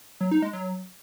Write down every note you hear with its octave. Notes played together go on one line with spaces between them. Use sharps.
F#3
D#4
G#3
F#3